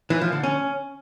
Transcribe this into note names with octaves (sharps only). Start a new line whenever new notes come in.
E3
F3
D3
C#4